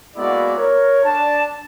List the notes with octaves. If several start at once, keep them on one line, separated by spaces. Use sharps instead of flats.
G#3 A#3 B3 E4 F#4 D5
A#4 C#5
D4 A5